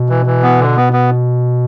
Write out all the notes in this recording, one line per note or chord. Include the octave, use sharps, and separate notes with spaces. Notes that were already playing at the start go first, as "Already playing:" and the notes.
Already playing: B2
E3
E3
B3
D3
B3
B3